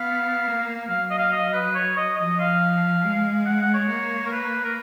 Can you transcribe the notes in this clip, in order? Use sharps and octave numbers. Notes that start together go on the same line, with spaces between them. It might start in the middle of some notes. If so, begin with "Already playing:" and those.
Already playing: B3 F5
A#3
F#3 F5
D#5
F5
D#5
B4
C#5
D#5
F3 D#5
F5
G#3
F#5
F#5
C#5
A#3
A#4
B4
A#4